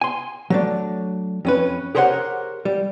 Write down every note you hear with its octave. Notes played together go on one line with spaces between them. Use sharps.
G#5 C6
F#3 A3 D4
F2 C#4 B4
G4 G#4 A#4 C5 C#5 F#5
G3